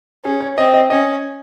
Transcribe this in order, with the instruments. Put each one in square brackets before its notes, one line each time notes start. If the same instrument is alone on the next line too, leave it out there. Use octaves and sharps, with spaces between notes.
[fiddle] C#4 [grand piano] G#4
[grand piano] C#5
[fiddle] C4 [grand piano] D#5
[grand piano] D#5
[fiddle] C#4 [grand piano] D#5